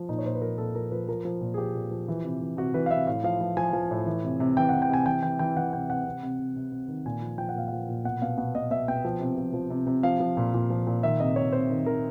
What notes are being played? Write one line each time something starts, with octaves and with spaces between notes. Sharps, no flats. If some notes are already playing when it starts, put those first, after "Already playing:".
Already playing: F3
A#2 D#4
C#5
A#2 C5
B4
F3 A#4
A#2 A4
F3 A#4
F3 B4
F3 A#4
F3
A#2
G#4
F3 G4
A#2
F3
E3
C3
E3
C3 F#4
E3 B4
F5
C3 E5
A2 F5
F3 F5
F3
F3 G#5
F3
A2
E3
C3
C3
E3 G5
E3 F#5
G5
C3 G#5
E3 G5
E3 G5
E3 G5
E3 F#5
C3 G5
C3 F#5
C3
C3
C3
C3
C3
D#3
A#2 G#5
F3
F3 G5
F#5
A#2 F5
F3 F#5
A#2
B2 F#5
B2 F5
B2 F#5
B2 D#5
B2 E5
B2 G5
F3
C3
F3
F3
C3
C3
F3 F5
F3
A#2
A#2
F3
A#2
D#3 E5
C3 D#5
C3 C#5
C3 C5
D#3
D#3 A#4